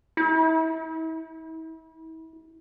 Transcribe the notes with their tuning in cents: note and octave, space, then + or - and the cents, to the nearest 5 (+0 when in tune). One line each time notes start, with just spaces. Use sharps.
E4 -35